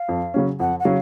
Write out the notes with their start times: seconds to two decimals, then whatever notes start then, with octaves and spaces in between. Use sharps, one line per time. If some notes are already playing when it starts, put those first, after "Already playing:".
Already playing: F5
0.09 F2
0.34 C#3 F#3 C#4
0.60 F2 F#5
0.80 F#5
0.85 C#3 F#3 C#4 F5